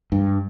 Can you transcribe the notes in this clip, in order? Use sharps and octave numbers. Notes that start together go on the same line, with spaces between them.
G2